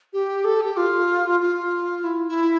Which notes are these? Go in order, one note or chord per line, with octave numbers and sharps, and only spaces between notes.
G4
A4
G4
F4
F4
E4
E4